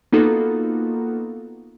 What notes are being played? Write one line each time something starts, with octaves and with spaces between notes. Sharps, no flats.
A#3 B3 D#4 F4 F#4 A4